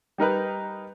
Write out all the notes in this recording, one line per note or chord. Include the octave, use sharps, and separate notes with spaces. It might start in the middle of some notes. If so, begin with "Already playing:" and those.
G3 D#4 A#4 B4